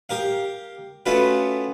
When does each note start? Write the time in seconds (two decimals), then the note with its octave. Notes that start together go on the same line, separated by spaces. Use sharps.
0.09 G4 A#4 F5
1.06 A3 B3 C#4 F4 F#4 B4